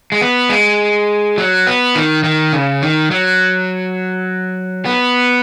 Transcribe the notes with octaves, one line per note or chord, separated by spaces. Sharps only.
G#3
B3
G#3
F#3
B3
D#3
D#3
C#3
D#3
F#3
B3